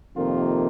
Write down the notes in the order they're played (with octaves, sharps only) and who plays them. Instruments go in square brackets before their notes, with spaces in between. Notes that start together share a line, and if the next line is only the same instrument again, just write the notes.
[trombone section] F2 C3 D#3 A#3 F4